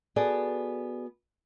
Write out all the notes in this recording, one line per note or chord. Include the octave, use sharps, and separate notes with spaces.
B3 F#4 G#4 A4 D5